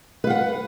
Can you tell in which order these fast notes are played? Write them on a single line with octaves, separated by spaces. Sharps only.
B4 F5 F#5